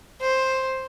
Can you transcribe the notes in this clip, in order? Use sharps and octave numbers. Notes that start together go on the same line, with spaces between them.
C5